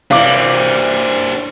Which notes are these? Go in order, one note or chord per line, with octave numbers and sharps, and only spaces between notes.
F#2 C3 E3 G3 D4 C5 F5 D6